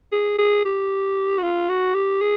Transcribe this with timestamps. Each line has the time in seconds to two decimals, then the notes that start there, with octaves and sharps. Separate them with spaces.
0.12 G#4
0.38 G#4
0.65 G4
1.38 F#4
1.42 F4
1.69 F#4
1.95 G4
2.21 G#4